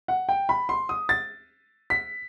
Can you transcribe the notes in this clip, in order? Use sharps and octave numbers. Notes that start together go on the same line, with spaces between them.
F#5
G5
B5
C6
D#6
A6
B6